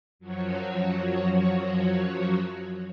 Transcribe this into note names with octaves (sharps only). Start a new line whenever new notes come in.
F#2 F3 F#3 F#4 C#5